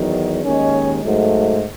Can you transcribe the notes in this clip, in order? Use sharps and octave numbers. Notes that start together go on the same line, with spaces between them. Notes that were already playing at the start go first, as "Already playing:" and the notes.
Already playing: E2 D#3 F#3
D#2 D#3 G#3 C#4
G#2 F#3 A3